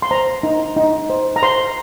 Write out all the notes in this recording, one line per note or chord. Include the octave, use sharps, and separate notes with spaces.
C6
C5 A#5
D#4
D#4
C5
A#5
C5 C6